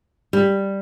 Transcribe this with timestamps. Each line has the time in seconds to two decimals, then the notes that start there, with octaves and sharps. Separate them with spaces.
0.33 G3